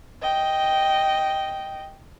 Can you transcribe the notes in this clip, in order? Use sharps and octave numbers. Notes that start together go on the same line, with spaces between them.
D#5 G5